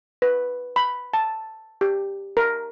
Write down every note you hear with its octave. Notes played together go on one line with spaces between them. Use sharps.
B4
B5
A5
G4
A#4